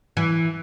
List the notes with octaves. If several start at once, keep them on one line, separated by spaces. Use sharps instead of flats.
E3